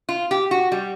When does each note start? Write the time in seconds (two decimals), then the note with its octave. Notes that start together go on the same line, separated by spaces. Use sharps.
0.09 F4
0.31 G4
0.51 F#4
0.72 G3